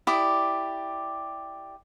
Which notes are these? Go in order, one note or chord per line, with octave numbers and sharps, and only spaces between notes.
E4 G4 D5 D#6